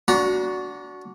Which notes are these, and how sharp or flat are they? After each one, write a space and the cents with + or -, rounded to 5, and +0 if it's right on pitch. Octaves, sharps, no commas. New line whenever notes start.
D4 -20 F#4 +0 A#5 +30